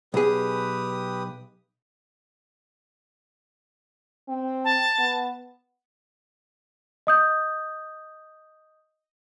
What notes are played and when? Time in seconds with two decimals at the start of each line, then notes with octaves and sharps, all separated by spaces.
0.14 B1 G4 G#4 B4 D#6
4.28 C4
4.64 A5
4.99 B3
7.07 D#5 D#6 G6